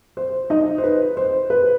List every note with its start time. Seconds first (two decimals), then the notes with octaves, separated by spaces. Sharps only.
0.17 C5
0.50 D#4 D#5
0.78 C5
0.84 B4
1.17 C5
1.50 B4